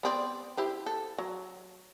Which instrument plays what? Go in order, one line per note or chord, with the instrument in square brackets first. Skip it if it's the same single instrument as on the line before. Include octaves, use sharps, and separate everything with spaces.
[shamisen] B3 C4 D5
E4 G4 C5
A4
F#3